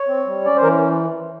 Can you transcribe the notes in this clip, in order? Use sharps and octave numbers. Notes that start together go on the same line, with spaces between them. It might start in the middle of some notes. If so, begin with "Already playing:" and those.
Already playing: C#5
C4
G3
C#4 D5
C5
E3 A#4